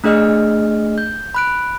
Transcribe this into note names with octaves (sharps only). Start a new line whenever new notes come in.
A3 D4 G#4 D#5 F6
G6
B5 F#6 D7